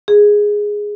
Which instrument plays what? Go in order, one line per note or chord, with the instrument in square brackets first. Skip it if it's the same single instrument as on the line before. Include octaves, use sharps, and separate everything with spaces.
[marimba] G#4